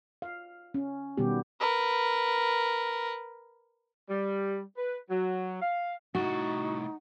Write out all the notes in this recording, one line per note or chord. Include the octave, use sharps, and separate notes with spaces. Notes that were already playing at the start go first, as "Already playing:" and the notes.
F5
C#4
B2 D#3 G3 B3 G4
A#4 B4
G3
B4
F#3
F5
C2 A2 D#4 F#4